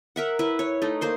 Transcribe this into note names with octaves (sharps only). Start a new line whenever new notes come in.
A#4 E5 F#5
E4 B4 E5
C#5
A3 D#4
A#3 C5 C6